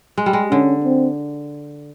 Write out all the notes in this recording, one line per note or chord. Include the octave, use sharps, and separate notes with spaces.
G#3
G3
G#3
D3 C#4
C4